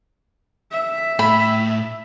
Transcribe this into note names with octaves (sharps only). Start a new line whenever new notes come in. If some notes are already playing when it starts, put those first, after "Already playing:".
E5
A2 B5